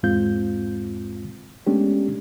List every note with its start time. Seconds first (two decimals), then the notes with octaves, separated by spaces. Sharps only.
0.03 E2 G#2 G#3 C4 F4 G6
1.67 G#3 A3 B3 C#4 D4 G4